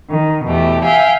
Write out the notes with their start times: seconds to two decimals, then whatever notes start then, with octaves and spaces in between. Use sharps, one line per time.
0.10 D#3
0.45 E2 B2 A3 G4
0.85 E5 F5 G5 G#5